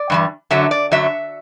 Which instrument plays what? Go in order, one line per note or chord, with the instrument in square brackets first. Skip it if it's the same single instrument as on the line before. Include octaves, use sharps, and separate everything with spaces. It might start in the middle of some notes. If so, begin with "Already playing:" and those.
Already playing: [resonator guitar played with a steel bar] D5
G2 E3 G3
F#2 D3 F#3 E5
D5
F#2 D3 F#3 E5